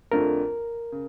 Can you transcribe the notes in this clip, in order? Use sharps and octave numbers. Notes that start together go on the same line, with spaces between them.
F2 D3 A3 D4 F4 A#4
C#3